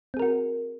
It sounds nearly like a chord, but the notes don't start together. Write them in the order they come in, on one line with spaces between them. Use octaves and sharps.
C4 G#4 A#4 F#4